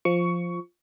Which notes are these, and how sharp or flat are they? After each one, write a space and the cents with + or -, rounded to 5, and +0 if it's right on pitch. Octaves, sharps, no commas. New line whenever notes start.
F3 +0 C#6 +15